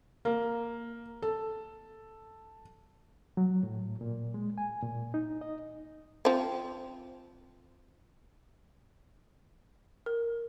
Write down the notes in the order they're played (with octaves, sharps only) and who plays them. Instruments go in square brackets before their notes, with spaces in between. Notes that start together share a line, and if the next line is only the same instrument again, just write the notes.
[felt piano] A#3
A4
[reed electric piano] F#3
A2
A#2
G#3
G#5
A#2
D#4
D#5
[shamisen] F3 C4
[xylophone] A#4